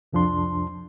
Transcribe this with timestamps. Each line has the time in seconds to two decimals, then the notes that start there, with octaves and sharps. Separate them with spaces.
0.13 C2 F2 F3 D4 C6